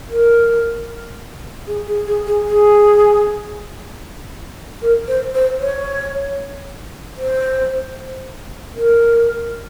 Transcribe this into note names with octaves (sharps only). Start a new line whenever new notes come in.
A#4
G#4
G#4
G#4
G#4
G#4
A#4
C5
C5
C#5
C5
A#4